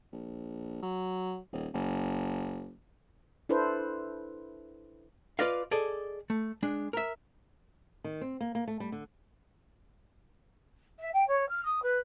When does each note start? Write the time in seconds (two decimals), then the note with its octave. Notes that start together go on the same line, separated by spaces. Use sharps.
0.12 A#1
0.82 F#3
1.52 D#1
1.74 F#1
3.49 D4 E4 A4 B4 C5
5.39 F4 B4 D5 D#5 F5
5.71 G#4 A4 D5 D#5
6.30 A3
6.63 G#3 D4
6.93 A#4 E5
8.04 D#3
8.21 C4
8.40 A#3
8.55 A#3
8.67 A3
8.80 G3
8.92 D3
10.99 E5
11.13 G5
11.27 C#5
11.49 F6
11.65 D#6
11.82 B4